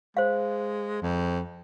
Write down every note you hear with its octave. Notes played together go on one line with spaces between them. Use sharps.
G#3 C5 F5
F2